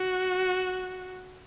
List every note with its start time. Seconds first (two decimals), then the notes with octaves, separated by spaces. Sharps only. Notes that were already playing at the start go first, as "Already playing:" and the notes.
Already playing: F#4